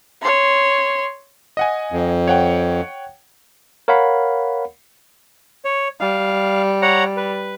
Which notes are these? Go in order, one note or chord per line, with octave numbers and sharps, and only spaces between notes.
C#5 C6
D#5 F#5 G#5
F2
C#5 F#5 G5
A#4 C#5 F5 F#5 B5
C#5
G3 F5
C#5 F#5 A#5
B4